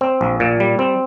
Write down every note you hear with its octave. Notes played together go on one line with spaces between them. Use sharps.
C4
A#1
A#2
G3
C4